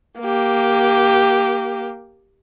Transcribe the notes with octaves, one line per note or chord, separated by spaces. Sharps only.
A#3 G4